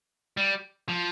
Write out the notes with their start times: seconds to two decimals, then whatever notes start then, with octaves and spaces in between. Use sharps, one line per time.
0.37 G3
0.89 F3